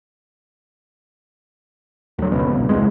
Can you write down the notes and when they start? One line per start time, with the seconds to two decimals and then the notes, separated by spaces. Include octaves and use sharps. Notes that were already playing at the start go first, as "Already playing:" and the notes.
2.19 D2 F#3
2.32 F#1 C#2 B2
2.53 G1 C2
2.69 E1 C2 G#3